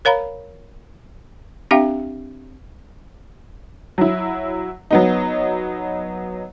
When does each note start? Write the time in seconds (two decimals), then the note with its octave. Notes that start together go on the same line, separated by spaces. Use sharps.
0.05 A#4 C#5 F5 A#5 B5
1.71 C4 D4 G4 E5 F5 G5
3.98 F#3 E4
4.91 F#3 B3 D#4